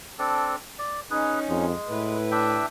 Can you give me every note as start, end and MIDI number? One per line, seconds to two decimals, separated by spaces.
0.19 0.56 60
0.19 0.56 62
0.19 0.56 69
0.79 1.00 74
1.11 1.65 61
1.11 1.65 63
1.11 1.40 68
1.11 1.40 71
1.49 1.73 41
1.49 2.17 56
1.88 2.62 45
1.88 2.64 64
1.88 2.64 71
2.31 2.66 62
2.31 2.66 76
2.31 2.66 79